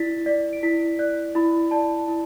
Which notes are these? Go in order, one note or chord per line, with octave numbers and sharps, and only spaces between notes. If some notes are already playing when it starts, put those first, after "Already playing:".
Already playing: E4 D5 A6 B6
D5 B6
D7
E4 B6
D5 F#6
E4 B5
D5 A5
E4